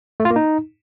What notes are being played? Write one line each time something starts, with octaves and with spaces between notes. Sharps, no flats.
A3
F4
A#3
D#4